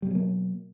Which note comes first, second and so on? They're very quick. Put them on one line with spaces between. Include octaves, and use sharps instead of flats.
G3 B2 F#3 A#3